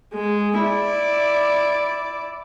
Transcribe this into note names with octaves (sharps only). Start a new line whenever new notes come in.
G#3
E4 D5